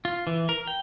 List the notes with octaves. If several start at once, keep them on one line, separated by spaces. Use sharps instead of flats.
F4
E3
A#4
G5